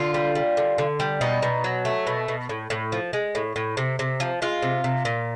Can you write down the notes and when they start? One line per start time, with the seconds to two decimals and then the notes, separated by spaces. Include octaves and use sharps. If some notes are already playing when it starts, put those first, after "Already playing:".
Already playing: D3 F4
0.14 G3
0.35 G3
0.57 D3
0.78 D3
1.00 G3
1.21 B2 D#4
1.42 B2
1.64 F#3
1.85 A3
2.07 B2
2.28 B2
2.49 A2
2.70 A2
2.92 F3
3.13 G#3
3.35 A2
3.56 A2
3.77 C3
3.99 C3
4.20 F3
4.42 G#3 F4
4.62 C3
4.84 C3
5.05 A#2